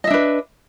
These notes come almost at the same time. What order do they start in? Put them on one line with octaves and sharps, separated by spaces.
D#5 E5 D4 B4